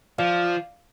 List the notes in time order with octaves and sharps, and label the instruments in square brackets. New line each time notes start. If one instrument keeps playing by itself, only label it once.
[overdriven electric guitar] F3 [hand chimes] D5 F5